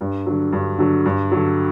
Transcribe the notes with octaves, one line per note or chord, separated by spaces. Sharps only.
G2
D3 F#3
G2
D3 F#3
G2
D3 F#3